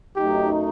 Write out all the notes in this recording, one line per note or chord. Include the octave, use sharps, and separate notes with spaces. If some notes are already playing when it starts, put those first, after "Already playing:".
F#2 F#3 A3 D#4 F#4 G4